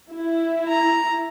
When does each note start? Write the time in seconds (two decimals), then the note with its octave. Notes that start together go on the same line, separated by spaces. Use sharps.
0.12 E4
0.68 A#5